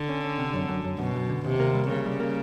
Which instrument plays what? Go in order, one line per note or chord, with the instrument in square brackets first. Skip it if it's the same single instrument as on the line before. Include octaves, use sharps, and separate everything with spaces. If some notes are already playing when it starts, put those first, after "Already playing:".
Already playing: [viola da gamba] D3
[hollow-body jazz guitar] C#4
C#4
C3
F#2
F#2
F#2
[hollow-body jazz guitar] F#2 [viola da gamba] B2
[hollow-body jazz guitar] F#2
D3
[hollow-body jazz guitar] D#2 [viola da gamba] C3
[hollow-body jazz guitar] A#3
G3
[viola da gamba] C#3 [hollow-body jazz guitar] A#3
[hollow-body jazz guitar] G3
A#3